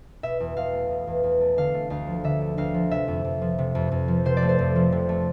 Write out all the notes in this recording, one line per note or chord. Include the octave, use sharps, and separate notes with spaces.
B2 E5
E2
E2 F5
A3
B2
E2
E2
A3
D3 F5
A3
D2 F5
F3
D3 E5
A3
D2 F5
F3
C3 E5
F2
F2
F3
C3
F2
F2
F3
C3 C5
D5
A3
C5
F2
F3
C3
A3